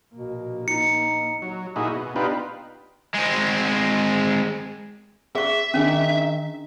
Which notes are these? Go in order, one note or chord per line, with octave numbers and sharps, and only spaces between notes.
A#1 B2 A#3
D#4 C#7
F#3
A#2 D#4 E4 F#4 G#4
B2
B3 D4 D#4 F4 G4 B4
G#3 C4
G#4 E5 C#6
D#3 C#4 D4 G#4